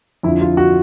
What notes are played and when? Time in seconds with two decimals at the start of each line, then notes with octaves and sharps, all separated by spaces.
0.23 F2 D3 F3 E4
0.41 F4
0.57 F#4